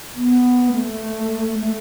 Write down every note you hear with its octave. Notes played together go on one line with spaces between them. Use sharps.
B3
A3
A3